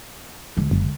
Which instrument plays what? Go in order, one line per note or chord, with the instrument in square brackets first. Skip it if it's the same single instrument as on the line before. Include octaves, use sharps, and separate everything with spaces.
[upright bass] D2 G#3
[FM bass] F#1